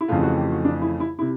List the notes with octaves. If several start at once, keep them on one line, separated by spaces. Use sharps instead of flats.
E4
F2 C#3 E3 A3 F4
F#4
G4
F#4
D4
E4
E4
C3 E4